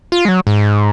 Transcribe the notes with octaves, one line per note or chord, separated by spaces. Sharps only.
F4
G#3
F#3
G#2